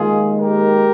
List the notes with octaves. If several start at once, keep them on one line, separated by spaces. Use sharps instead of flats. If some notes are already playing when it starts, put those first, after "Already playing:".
Already playing: D#2 D#3 G#3 F4 G#4
G4 A#4